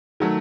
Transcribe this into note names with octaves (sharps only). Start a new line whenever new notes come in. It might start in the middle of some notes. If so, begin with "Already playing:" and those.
D#3 F#3 A3